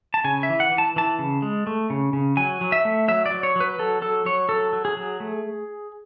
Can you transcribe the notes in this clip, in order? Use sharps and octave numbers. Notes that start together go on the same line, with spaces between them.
A5
C#3 G#5
E5
E3
F#5
E3
A5
E3 A5
C#3
G#3
A3
C#3
C#3
F#3 G#5
F#3
E5
A3
F#3 E5
D5
F#3
C#5
F#3 B4
F#3 A4
F#3 A4
F#3 C#5
F#3 A4
F#3
G#4
F#3
A3